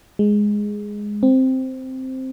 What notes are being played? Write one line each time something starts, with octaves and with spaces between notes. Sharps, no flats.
G#3
C4